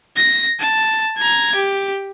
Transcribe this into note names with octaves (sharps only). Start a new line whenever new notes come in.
A#6
A5
A#5 G#6
G4